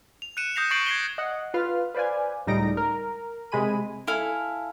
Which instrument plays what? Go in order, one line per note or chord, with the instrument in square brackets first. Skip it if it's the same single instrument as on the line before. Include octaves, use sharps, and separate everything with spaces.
[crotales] F7
F#6 C#7 D#7 E7
D#6 G6 A#6 C7 F7
C#6 A6 A#6 C7 D7 F#7
G#6 A#6 C7 E7 G7
[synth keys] D#5 F#5
F4 B4 F5 F6
B4 C5 D5 F5 G#5
C#2 A2 G3 D#4 A#6 D7
A#4
C3 G#3 G#5 B5 D#7
[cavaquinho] E4 A4 F5 G#5